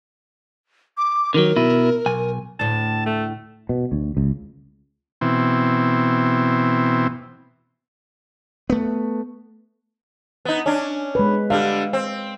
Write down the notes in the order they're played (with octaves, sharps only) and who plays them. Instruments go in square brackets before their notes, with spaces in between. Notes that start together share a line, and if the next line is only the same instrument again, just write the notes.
[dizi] D6
[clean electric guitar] D3 D#3 F#3 [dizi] A#4
[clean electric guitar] B2 E4
B1 G#5
[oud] D2 A2 [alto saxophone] A5
[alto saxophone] A3
[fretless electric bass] B2
D2
C#2
[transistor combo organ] B2 E3 C4
[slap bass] A3 B3
[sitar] B3 D#4
C#4 D4
[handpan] G#3 B4
[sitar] D3 G3 [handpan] F5
[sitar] C4